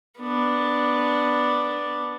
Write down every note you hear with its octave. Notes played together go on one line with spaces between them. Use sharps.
B3 D4